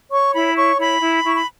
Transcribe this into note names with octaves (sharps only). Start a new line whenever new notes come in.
C#5 C#6
E4 B5
C#5 C#6
E4 B5
E4
E4 C#6
B5